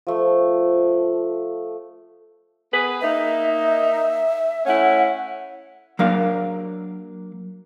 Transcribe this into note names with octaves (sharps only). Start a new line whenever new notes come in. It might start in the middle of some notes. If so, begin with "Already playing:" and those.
F3 A3
B3 G#4 B4
A#3 D#4 E5
A3 C#4 E4 F#5
F#3 A#3 D4 A#4 F5